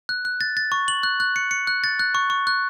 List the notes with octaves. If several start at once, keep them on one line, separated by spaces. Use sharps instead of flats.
F#6
F#6
A6
A6
C#6
F#7
F#6
F#6
C#7
C#7
F#6
A6
F#6
C#6
C#6
F#6